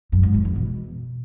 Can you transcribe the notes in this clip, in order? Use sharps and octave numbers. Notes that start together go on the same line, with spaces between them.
F#2
G#2
F2
E2
B2